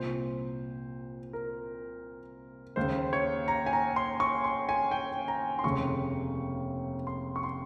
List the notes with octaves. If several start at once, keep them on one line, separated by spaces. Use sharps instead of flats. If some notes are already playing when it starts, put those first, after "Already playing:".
Already playing: C2 A#2 C5
A#4
D#2 C#3 C5
C#5
A#5
G#5
A#5
C6
C#6
C6
G#5
G5
A#5
C6
F1 D#2 C#3 C#6
C6
C#6
C6